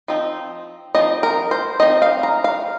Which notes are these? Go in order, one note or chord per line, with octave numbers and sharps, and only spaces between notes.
F3 C4 D#4
F3 C4 D#4 D#5
A#4
C5
F3 C4 D#4 D#5
F5
A#5
F5